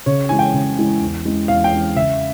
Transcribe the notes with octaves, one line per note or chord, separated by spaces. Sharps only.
C#3 C#5
E3 G#3 E4 G#5
G5
C#3
E3 G#3 E4
E2
E3 G#3 C#4
E2 F5
G5
E3 G#3 C#4
C#3 E5